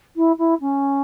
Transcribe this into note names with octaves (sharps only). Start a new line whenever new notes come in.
E4
E4
C#4